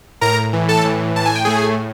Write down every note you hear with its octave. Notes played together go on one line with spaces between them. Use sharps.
A2 A#4 A#5
E3
A4 A5
A2
A2 A5
G#5
G5
A3 G#4 G#5